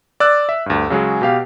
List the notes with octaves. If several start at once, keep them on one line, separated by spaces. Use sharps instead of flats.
D5 E6 F#6
E5
D2 G2
C#3 F#3 G#3 G#4
B2 G4 F5